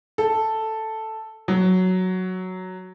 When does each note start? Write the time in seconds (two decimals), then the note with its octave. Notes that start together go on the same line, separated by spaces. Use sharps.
0.18 A4
1.48 F#3